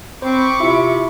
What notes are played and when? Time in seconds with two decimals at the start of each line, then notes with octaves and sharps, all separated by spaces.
0.22 C4 C5 B5 C#6 D6
0.60 C3 E4 F4 C#7